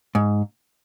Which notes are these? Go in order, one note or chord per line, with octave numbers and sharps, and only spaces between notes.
G#2